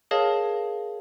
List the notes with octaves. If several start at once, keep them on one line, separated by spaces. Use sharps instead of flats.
G#4 A#4 C#5 D#5 F5 A5